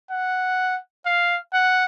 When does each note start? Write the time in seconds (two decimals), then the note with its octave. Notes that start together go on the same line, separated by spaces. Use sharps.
0.10 F#5
1.06 F5
1.53 F#5